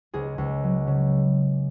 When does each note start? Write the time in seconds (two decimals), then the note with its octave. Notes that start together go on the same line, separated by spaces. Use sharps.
0.14 C#2 G#4
0.38 C#2
0.64 F#3
0.87 C#3